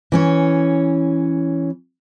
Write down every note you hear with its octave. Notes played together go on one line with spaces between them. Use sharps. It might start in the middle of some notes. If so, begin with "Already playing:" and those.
E3 C#4 C#5